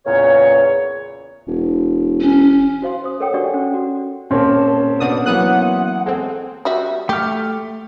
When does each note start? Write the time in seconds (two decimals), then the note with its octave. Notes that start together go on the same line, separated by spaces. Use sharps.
0.05 E2 A#2 C#3 C#5
1.47 E1
2.20 C#4
2.82 F#4 C5 F5 C6
3.04 C5 D#6
3.20 A4 A#4 C#5 F#5 G5
3.34 D4 F#4 G4 D5 F#5 C#6
3.54 C#4 F#5
3.74 F#4
4.31 D#1 A#3 C4 C#4 A5
5.00 B2 D4 F#5 D#6
5.26 E3 F#3 A#3 B3 D#6 F#6
6.06 G#3 C4 A4
6.65 G3 F#4 E5
7.09 A3 G4 F6